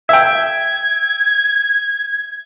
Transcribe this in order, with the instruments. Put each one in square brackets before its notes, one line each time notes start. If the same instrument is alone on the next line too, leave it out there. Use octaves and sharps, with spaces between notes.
[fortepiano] E5 G5 [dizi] G#6